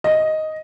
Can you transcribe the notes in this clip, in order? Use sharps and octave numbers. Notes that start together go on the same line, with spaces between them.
D#5